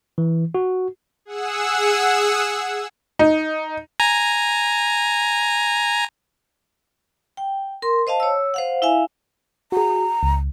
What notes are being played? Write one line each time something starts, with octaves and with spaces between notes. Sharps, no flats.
E3
F#4
G#4 F#5 E6
D#4
G#5 A#5
G5
A#4 C6
C5 D#5 F5 A5
C#5 E6
C5 F5 F#5
E4 E5 F5 G#5
F#4 G#4 A#5
C#2